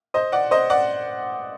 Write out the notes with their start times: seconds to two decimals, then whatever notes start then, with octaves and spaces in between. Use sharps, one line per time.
0.14 C5 D#5
0.32 D5 F#5
0.51 C5 D#5
0.70 D5 F#5